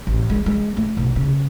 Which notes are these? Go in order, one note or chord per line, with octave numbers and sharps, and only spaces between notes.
A1
G#3
G#3
A3
B1
C#3